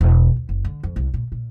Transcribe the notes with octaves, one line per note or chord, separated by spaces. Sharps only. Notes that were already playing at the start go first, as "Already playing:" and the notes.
E1
D#2
F#1
D3
F2
C2
A#2
A#2